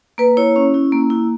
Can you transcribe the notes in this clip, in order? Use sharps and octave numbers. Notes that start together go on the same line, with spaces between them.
A#3 B4
E4 C#5
C#4
E4
A#3
E4